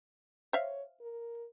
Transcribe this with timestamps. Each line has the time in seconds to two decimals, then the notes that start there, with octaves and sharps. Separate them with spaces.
0.53 C5 C#5 E5 F5
1.01 A#4